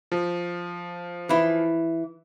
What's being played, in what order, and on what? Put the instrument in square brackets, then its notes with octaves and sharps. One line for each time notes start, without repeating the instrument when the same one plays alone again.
[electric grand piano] F3
[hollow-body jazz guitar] E3 E4